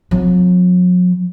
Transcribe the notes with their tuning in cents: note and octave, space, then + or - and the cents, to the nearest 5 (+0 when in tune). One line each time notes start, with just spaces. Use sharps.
F#3 -45 C4 -15